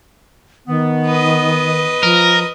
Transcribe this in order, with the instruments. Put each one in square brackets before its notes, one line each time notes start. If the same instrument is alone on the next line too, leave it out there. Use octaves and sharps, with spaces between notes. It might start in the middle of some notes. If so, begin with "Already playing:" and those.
[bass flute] D#3 [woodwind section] B3
[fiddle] B4 D#5
[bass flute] F3 [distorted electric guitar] A#4